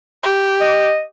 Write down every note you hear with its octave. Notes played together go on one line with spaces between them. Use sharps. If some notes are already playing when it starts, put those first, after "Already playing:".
G4
D#5